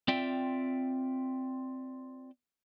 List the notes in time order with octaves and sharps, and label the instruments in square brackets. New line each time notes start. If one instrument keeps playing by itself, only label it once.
[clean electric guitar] C4 F4 D5 E5 G5